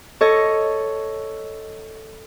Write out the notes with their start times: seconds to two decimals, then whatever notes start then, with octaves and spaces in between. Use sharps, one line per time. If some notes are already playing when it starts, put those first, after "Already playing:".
0.21 A4 C#5 D#5